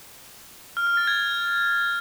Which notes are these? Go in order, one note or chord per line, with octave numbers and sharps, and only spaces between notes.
F6
F6
A6
G#6